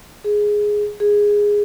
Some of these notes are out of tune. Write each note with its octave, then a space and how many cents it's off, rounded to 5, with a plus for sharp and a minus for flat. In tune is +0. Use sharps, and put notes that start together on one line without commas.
G#4 +0
G#4 -10